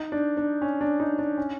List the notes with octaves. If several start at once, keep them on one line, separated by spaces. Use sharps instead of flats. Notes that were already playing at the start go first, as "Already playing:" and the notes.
Already playing: D#4
D4
D4
C#4
D4
D#4
D4
C#4